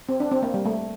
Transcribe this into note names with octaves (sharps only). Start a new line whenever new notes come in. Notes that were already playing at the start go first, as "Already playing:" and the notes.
C4
D4
C4
A#3
G3
A3